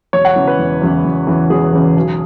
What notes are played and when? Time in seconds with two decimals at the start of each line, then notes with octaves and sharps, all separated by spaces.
0.13 E1 C#5
0.25 F#5
0.36 E2 C#3 E3
0.47 B4
0.59 E1
0.82 E2 C#3 E3
1.05 E1
1.27 E2 C#3 E3
1.50 E1 G#4
1.73 E2 C#3 E3
1.96 B1